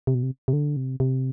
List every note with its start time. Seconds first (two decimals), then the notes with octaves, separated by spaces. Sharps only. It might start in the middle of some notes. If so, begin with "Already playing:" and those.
0.07 C3
0.15 B2
0.23 C3
0.48 C3
0.53 D3
0.76 C3
1.00 C3